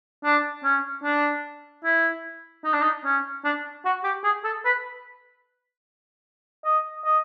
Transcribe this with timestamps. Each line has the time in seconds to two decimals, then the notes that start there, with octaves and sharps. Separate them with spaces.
0.25 D4
0.64 C#4
1.04 D4
1.85 E4
2.64 D#4
2.74 D4
2.82 D#4
3.05 C#4
3.45 D4
3.85 F#4
4.04 G4
4.24 G#4
4.44 A4
4.65 B4
6.65 D#5
7.05 D#5